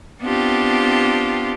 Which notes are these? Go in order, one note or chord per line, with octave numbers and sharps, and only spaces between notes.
B3 C4 D4 F4 G4